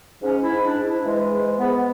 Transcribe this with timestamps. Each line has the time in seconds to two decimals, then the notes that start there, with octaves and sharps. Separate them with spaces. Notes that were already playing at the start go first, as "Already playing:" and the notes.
0.22 G#2 C#4
0.43 E4
0.50 G#2
0.63 D4
0.77 G#2
0.83 E4
1.03 E3 G#3
1.31 G#2 G#3
1.58 G#2 B3